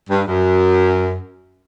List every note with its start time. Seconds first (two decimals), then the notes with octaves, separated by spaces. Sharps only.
0.10 G2
0.28 F#2